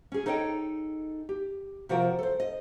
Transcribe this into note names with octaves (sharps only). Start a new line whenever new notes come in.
C#4 G#4
D#4 A4 C#5 D#5 F5 G5
G4
C3 F3 F4 F#4 A#4 G5
A4 C5
D#5